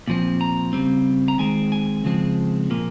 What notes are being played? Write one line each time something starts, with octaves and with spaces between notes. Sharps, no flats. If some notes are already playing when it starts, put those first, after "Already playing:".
A#2 F3 C4
A#5
C#3 G3 C4
A#5
D#3 G#3 C4 G#5
G#5
C#3 F3 G#3 C4
A#2 F3 A#3